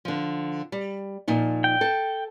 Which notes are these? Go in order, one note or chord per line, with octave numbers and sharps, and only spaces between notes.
D3 F3
G3
A#2 F3 D#4
G5
A4